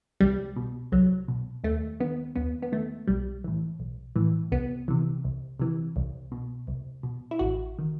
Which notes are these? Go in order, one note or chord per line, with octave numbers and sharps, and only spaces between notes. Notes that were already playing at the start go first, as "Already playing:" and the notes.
C2 G3
B2
C2 F#3
B2
D#2 A3
D#3 B3
D#2 B3
B3
D#3 A3
B1 G3
A2 E3
B1
A2 E3
C2 B3
C3 E3
C2
C3 E3
C2
B2
C2
B2
E4
A1 F#4
D#3